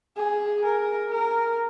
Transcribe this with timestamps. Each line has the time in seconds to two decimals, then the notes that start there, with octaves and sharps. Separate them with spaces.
0.17 G#4
0.64 A#4
1.12 A#4